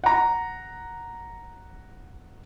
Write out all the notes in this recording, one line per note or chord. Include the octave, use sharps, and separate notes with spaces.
F#5 A#5